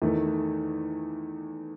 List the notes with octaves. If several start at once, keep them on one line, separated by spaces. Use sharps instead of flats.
E2 D#3 A3